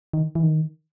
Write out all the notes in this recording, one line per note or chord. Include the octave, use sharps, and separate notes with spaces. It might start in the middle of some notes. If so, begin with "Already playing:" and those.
D#3
E3
D#3